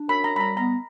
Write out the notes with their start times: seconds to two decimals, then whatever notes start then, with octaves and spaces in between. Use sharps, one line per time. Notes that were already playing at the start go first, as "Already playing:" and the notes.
Already playing: D4
0.09 F#2 B5
0.24 A#5
0.33 G3 B5
0.40 A#5
0.57 B3 A#5